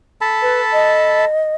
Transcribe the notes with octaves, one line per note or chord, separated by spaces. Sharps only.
A4 A5 B5
B4
D#5